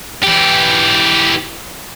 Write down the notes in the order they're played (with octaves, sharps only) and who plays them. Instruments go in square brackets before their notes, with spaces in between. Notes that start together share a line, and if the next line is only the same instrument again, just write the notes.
[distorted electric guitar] E3 G4